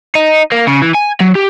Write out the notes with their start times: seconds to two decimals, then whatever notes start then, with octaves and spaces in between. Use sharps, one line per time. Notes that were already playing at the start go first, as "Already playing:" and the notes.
0.15 D#4
0.52 A#3
0.67 C#3
0.82 E3
0.95 G#5
1.20 F#3
1.35 G4